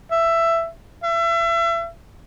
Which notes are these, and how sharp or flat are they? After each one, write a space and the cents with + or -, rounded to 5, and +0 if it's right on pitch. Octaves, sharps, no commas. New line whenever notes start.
E5 +15
E5 +35